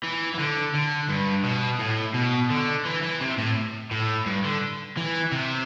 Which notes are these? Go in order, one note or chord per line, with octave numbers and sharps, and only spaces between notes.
E3
E3
D3
D3
G2
B2
A2
B2
D3
E3
E3
C3
A2
A2
G2
D3
E3
C3